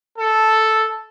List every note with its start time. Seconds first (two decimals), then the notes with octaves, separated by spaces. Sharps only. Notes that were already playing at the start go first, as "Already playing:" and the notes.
0.18 A4